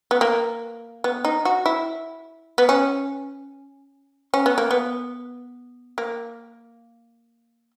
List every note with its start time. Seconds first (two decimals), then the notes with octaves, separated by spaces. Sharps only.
0.11 B3
0.21 A#3
1.04 B3
1.25 D#4
1.45 F#4
1.66 E4
2.58 B3
2.69 C#4
4.34 C#4
4.46 B3
4.58 A#3
4.71 B3
5.98 A#3